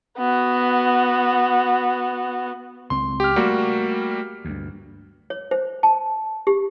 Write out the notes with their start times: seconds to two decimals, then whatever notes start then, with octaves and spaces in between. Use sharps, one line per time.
0.18 B3 F#4
2.90 C#2 C4 C6
3.20 G4 F6
3.36 G3 A3 A#3 F#4
4.45 D2 G2
5.30 C#5
5.51 C5
5.83 A5
6.47 G4